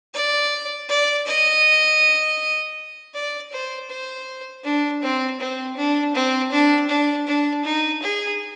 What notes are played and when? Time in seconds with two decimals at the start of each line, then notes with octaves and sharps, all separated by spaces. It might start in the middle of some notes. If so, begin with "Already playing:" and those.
0.14 D5
0.89 D5
1.27 D#5
3.15 D5
3.52 C5
3.90 C5
4.64 D4
5.03 C4
5.40 C4
5.77 D4
6.15 C4
6.52 D4
6.89 D4
7.27 D4
7.65 D#4
8.02 G#4